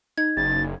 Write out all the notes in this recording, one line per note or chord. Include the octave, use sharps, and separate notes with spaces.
D#4 G#6
F#1 A6